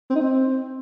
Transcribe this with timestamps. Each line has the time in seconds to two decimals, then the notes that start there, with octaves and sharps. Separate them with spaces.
0.10 C4
0.16 D#4
0.21 C4